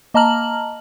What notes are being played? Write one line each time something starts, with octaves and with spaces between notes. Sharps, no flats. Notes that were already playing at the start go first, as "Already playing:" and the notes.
A#3 D#5 A5 A#5 F6 F#7